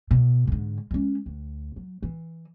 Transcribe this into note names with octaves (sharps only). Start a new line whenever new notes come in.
B2
G#2 D3
G#3 C#4
D2
F#3
E3